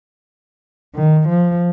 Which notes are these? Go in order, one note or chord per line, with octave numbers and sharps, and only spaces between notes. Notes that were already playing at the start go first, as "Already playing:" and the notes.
D#3
F3